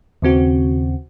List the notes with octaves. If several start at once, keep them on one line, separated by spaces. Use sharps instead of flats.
D#2 C#3 C4 F#4